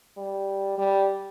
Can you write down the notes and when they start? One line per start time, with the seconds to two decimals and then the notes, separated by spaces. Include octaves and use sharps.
0.17 G3
0.78 G3